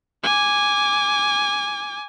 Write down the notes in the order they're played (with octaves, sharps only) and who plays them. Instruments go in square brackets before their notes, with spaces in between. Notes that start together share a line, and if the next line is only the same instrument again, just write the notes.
[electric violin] G#5 D6